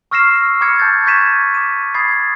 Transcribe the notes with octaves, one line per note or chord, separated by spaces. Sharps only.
C#6 E6 F6 A#6 C7 E7
B5 D6 F6 G#6 C#7
A5 G6 A6
C#6 G6 G#6 B6 D#7 E7
D6 D#7
B5 D#6 G#6 A6 C7